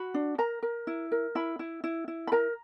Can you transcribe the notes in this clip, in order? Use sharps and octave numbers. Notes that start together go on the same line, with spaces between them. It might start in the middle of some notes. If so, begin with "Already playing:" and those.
Already playing: F#4 B5
D4
A#4 A#5
A#4
E4
A#4
E4 B5
E4
E4
E4
B5
A#4 A#5